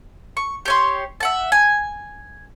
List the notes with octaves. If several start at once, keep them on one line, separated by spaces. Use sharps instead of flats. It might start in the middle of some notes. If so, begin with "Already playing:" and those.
C#6
G4 C#5 C6
E5 F#5 A5
G#5